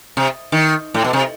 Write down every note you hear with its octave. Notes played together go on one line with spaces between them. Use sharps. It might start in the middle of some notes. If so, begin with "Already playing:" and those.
C3
D#3
A2
B2
C3